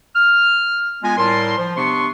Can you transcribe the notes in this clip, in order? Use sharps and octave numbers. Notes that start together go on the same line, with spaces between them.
F6
G#3 B3 F4 G#5
A2 G3 A#4 A5 C6
F3
C3 B3 D4 C6 C#6